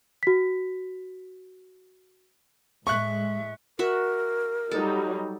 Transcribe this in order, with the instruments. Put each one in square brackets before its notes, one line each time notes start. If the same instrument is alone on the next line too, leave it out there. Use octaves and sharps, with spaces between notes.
[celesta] F#4 B6
[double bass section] A2 G#3 [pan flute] E5 [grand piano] C#6 F#6
[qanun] F#4 E5 [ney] A#4
[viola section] F#3 G3 D#4 [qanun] A4